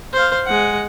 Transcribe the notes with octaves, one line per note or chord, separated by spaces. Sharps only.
C5 F5
G#3 F#5